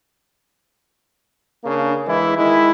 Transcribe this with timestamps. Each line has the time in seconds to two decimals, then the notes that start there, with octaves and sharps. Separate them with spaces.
1.63 C#3 A#3 D4
2.06 E3 G#3 E4
2.37 D#3 G#3 E4